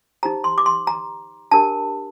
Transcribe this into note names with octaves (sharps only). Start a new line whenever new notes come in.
D#4 G4 C5 A#5
C6
D6
C6
A#5
D4 G4 A#4 A5